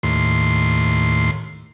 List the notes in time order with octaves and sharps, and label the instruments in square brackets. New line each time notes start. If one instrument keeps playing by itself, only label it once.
[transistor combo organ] D#2 A2 C6